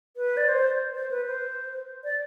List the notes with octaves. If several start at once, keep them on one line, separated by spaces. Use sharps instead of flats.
B4
D5
C5
C5
B4
C5
D5